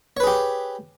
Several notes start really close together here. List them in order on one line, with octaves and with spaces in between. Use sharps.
C#5 B4 G#4 G4